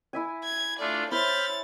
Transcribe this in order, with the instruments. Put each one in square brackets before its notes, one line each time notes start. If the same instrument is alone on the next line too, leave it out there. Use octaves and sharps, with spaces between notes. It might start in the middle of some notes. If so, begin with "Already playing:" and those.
[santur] E4 E5 G#5
[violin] G#6
[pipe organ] A3 D4 F4 [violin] D5
[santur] E4 C5 [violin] C#5 A6 [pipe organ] B5 F6 G6